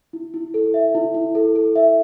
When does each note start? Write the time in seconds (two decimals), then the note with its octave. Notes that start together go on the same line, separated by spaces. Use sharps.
0.13 E4
0.34 E4
0.54 A4
0.74 E5
0.95 E4
1.14 E4
1.35 A4
1.56 A4
1.76 E5